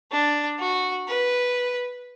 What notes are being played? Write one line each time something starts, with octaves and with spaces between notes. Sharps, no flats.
D4
F#4
B4